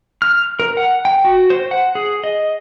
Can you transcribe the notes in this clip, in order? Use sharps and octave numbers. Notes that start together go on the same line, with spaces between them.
F6
A#4
F#5
G5
F#4
C5
F#5
G#4
D#5